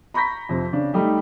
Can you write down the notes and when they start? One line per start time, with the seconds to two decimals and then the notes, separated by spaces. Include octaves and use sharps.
0.14 A#5 B5 C#6 G6 A#6 B6
0.49 F2 C3 F3
0.73 C#3 D4
0.94 G3 A3 D#4 G4